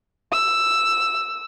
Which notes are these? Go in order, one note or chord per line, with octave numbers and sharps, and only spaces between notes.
E6